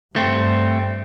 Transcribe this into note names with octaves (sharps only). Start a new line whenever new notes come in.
G2 A3 C4